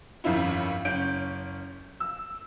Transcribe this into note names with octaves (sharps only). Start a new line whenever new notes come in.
G1 F2 D#3 C#4 E4 F4
F#1 C#4 G6 D7
E6